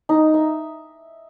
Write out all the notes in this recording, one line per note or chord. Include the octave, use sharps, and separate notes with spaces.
D#4
E5